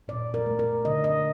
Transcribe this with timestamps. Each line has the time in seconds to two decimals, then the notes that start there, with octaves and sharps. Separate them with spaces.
0.08 A#2 D5
0.34 A#4
0.46 A3
0.59 A#4
0.85 D3 D#5
1.04 D#5